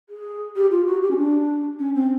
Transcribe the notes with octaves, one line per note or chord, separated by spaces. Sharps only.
G#4
G4
F4
F#4
G4
C#4
D4
C#4
C4